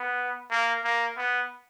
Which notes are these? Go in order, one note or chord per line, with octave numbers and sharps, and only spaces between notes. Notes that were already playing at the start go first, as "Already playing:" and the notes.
Already playing: B3
A#3
A#3
B3